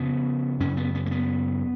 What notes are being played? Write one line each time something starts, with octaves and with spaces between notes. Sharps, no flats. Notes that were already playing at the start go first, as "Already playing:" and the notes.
Already playing: F2 C#3 B3
F#2 C#3 C#4
B3
B3
A#3
B3